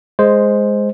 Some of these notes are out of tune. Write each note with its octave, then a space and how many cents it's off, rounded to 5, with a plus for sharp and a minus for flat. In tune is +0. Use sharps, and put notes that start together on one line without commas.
G#3 +0 C5 +0